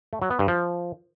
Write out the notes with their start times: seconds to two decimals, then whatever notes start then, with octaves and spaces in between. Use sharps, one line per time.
0.13 A3
0.22 F#3
0.30 B3
0.39 G2
0.48 F3